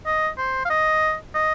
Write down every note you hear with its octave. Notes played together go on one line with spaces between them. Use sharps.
D#5
C5
F5
D#5
D#5